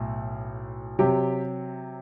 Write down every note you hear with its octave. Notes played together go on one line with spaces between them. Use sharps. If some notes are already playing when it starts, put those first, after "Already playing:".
Already playing: B1 A2
C3 F#3 G4